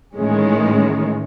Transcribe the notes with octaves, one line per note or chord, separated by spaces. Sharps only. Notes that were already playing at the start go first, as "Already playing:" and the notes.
A2 D#3 E3 G#3 C#4